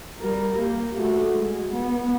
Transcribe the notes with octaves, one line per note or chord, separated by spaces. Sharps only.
G3 A#4
A#3 G4
A3 F#4
G#3
B3